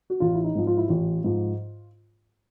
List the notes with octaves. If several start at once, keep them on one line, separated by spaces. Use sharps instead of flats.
F#4
A1 F4
E4
D#4
G#2 F3
F4
E4
A1 F4
G#2 F3